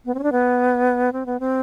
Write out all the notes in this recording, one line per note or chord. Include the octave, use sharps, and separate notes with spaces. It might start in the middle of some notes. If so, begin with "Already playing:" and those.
B3
C4
C#4
D4
B3
C4
B3
C4